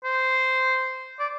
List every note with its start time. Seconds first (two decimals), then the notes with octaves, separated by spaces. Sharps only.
0.04 C5
1.19 D5